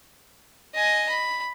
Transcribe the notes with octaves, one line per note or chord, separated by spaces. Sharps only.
D#5 G#5
B5